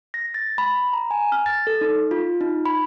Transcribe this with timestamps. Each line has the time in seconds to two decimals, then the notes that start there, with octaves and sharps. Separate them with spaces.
0.14 A#6
0.34 A6
0.58 B5
0.93 A#5
1.11 G#5
1.32 F6
1.46 A6
1.67 A4
1.81 D#4
2.11 F4
2.41 D#4
2.66 B5